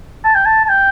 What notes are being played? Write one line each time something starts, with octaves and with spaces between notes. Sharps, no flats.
A5
G5
A5
A5
G5